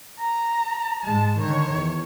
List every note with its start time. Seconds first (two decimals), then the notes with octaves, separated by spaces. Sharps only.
0.19 A#5
1.04 G#2 G#3 A5
1.39 D3 D#3 C#5
1.74 E2